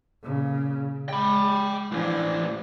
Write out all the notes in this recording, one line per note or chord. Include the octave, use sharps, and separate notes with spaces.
A#2 C#3
G#3 G5 B5
A2 E3 F3 D4